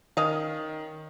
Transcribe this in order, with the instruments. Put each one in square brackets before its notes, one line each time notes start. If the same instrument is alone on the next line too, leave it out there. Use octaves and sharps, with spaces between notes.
[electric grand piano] D#3 [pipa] C#4 D#5 F5